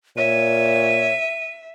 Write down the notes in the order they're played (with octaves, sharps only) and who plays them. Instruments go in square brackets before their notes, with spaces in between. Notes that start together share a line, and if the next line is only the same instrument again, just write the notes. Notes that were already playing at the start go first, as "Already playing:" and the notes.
[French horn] A#2 [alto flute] C#5 [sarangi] E5 [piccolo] D#7